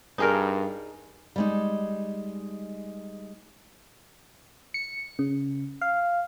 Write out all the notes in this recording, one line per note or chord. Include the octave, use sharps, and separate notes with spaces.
G2 D#4 G#4 A#4
G3 G#3 D#4
C#7
C#3
F5